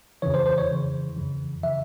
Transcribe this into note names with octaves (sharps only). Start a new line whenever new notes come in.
F2 C#3 E3 C#5
C5
C5
C#5
F2 C#3 E3
F2 C#3 E3
C#3 E3 E5